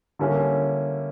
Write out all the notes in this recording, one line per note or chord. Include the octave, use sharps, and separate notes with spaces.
D3 G3 A#3 C#4 E4